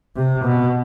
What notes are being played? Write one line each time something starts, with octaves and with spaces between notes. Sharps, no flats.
C3
B2